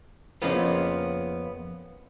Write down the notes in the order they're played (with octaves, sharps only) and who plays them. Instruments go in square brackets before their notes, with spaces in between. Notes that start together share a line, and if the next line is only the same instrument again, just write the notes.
[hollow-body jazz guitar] F2 C#3 F3 A#3 B3